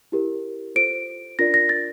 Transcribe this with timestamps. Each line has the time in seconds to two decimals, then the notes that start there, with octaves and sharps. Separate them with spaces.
0.12 E4 G4 A#4
0.75 F4 A4 C5 D7
1.39 D4 F4 A#4 D5 A#6
1.54 A#6
1.69 A6